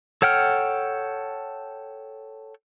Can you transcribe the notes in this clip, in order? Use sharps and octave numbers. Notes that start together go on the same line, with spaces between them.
A4 C#5 F#5 G5 F6